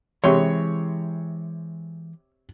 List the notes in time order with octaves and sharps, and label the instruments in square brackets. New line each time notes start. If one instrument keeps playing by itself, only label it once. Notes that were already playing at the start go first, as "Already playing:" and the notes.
[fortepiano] C3 C#5 [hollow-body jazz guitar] E3 G#3 C6